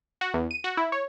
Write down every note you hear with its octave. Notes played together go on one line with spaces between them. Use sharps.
F#4
E2
D#7
F#4
E4
C#5